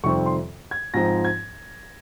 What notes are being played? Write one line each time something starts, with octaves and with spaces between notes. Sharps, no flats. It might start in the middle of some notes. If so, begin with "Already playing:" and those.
F2 C3 D#3 G3 C4 C#6
C6
G#6
G#2 F3 C4 D#4 A#6
G#6